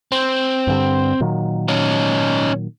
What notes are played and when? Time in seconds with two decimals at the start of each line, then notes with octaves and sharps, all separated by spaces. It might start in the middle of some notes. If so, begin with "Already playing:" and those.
0.12 C4
0.67 G2 D3 G3
1.20 A#2 D#3 F#3
1.68 C#4 D#4